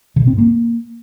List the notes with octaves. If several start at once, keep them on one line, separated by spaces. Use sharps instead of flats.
C#3
B2
C4
G#2
A#3